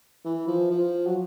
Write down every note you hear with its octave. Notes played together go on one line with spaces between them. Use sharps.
E3
F3
F3
F#3